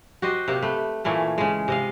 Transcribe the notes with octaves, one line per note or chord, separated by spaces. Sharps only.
F#4 G4 C5 D#5
C3 A#3 G4
A3 B4
A#2 E3 A3 C#4
C#3 G#3
C3 D#5 F5